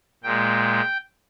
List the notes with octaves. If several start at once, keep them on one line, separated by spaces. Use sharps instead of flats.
A#2 G#3 G5